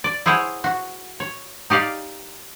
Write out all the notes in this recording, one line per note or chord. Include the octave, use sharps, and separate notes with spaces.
D5
E4 G#4 C5 C#5 F#5
F#4
C#5
D#4 G4 D5 F5